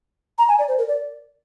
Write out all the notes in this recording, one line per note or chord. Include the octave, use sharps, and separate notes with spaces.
A#5
G#5
D5
C5
A#4
D5